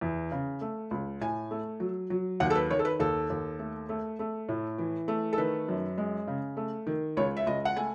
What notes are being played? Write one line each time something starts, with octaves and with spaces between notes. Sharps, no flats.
E2
C#3
A3
C#2
A2 G#5
A3
F#3
F#3
D#2 F#5
A4
B4
D#3 C#5
A4
B4
D#2 A4
D#2
A3
A3
A3
A2
E3
A3
A4
D#3 B4
F#2
G#3
C#3
A3
D#3
C#2 C#5
E5
C#2 D#5
F#5
A3 G#5